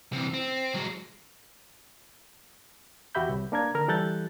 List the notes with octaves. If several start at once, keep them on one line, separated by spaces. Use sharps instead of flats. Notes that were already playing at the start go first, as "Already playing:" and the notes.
C3 E3
C4
F#3 G#3
E2 F#4 G4 E5 B5 G6
C2
A#3 D4 A#4 G#6
D3 A#4 F6
E3 G3 A4 F#6 G6 A6